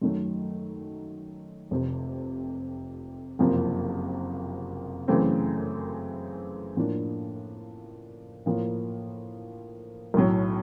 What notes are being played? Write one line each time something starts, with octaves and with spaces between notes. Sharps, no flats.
F#2 D#3 F#3 A3
F1 F2 C3
F#1 F2 C3 F3 A#3
F#2 C#3 E3 A3 C4
A2 F3 A#3 D4
A2 F3 A#3
B1 A2 F#3